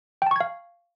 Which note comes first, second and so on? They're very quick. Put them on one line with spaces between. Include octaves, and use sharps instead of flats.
G5 A5 C#6 G#6 F5